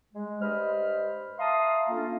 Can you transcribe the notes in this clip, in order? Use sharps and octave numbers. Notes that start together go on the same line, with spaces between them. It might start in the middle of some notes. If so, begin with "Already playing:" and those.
G#3
G2 C5 D#5 B5 F6
E5 F5 A5 A#5 C6 D#6
A3 A#3 C#4 D4 F4